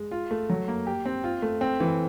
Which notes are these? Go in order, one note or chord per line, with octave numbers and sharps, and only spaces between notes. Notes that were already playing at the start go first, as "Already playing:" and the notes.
Already playing: G#3
F4
A3
F#3
A#3
G4
C4
F4
A3
C4
E3